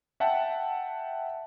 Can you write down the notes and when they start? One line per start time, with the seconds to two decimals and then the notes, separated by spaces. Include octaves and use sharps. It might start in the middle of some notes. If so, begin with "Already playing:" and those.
0.20 E5 F#5 G5 A5